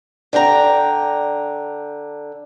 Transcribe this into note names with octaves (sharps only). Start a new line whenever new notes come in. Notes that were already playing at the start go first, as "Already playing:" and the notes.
D3 D4 G5 A#5